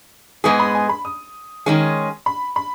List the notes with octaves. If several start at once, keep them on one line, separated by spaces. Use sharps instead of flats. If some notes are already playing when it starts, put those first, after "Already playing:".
G#2 G#3 B3 G#4 D#6
B5
G#5
B5
D#6
D#3 G#3 C#4 G#4
B5
B5